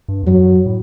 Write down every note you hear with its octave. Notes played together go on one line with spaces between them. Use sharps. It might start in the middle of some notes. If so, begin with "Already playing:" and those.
G2
E2
F#2 F#3
A2